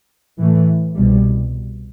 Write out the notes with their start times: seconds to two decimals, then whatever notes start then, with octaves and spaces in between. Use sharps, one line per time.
0.38 A2 E3 A3
0.96 C2 B2 G3